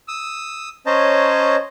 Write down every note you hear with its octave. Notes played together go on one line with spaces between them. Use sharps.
D#6 E6
C#4 C5 C#5 D#5 A5 A#5